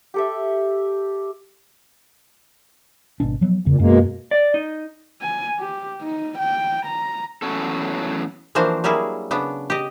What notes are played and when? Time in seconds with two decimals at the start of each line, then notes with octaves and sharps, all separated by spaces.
0.14 G4 A4 E5
3.20 G#1 B2 D4
3.41 F3 F#3 B3
3.66 E2 A#2 C#3
3.79 F#2 B2 G#3 A#3
4.31 D5
4.54 D#4
5.21 G#5
5.59 G4
6.01 D#4
6.38 G5
6.86 A#5
7.42 E2 A2 D#3 F#3 C#4 A4
8.55 E3 F3 A#3 D4 F#4 C5
8.84 F#3 G3 A#3 E4 G#4
9.31 C#3 B3 D4
9.70 G4 D#5